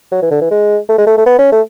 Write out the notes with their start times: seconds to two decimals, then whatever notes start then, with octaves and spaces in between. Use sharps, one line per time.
0.12 F#3
0.22 E3
0.31 D3
0.41 E3
0.51 G#3
0.89 A3
0.98 G#3
1.07 A3
1.17 A3
1.26 B3
1.39 C#4
1.52 A3